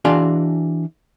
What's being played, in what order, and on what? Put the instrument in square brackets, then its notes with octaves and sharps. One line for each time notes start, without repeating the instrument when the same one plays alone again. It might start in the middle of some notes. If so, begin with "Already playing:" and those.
[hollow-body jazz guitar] E3 D4 F#4 G#4 F5 C6